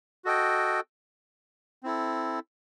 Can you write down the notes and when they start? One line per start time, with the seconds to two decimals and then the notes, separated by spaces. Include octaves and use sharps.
0.25 F#4 A4 D#5 G5
1.83 C4 E4 A4